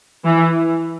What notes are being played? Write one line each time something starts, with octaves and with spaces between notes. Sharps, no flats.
E3